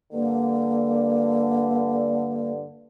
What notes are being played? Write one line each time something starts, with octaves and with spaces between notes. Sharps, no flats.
G2 D3 A#3